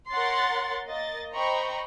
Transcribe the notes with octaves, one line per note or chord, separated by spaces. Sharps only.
A#4 C#5 F#5 C6 A6
A#3 D#5 A6
C5 D#5 G5 A#5 B5 C#6